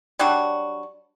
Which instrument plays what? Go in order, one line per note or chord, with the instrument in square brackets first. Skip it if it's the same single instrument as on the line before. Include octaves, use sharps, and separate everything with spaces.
[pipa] F#3 G3 D4 F#4